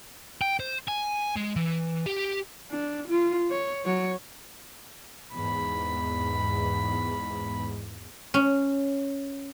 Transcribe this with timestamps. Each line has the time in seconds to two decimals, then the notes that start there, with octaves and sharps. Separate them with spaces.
0.41 G5
0.60 C5
0.88 G#5
1.36 G#3
1.56 E3
2.06 G4
2.71 D4
3.08 F4
3.51 C#5
3.85 F#3 C#5
5.35 E2 G#2 B5
8.34 C#4